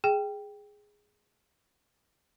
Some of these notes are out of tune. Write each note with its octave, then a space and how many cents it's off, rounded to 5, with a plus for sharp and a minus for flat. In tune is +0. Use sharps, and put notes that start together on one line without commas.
G#4 +0 G5 +0